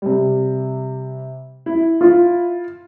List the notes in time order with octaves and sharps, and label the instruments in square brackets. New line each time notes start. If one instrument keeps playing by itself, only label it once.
[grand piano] C3 G3
E4
[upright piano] F4